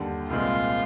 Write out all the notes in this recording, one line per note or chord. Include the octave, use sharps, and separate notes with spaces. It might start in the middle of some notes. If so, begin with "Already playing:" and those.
Already playing: D#2 D3 G3
C2 A#2 G#3 C4 F4